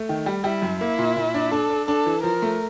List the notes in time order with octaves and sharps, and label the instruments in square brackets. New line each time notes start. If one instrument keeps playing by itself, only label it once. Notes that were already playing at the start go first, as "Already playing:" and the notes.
Already playing: [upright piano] A3
D#3
G3
[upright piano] G3 [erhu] E4
[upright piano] F#2
[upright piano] A#3 [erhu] E4
[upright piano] A#2
A#2
D4
[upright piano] D4 [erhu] A4
[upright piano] D4
[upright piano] D4 [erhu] A4
[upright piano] E3
[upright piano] F3 [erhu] A#4
[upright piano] A3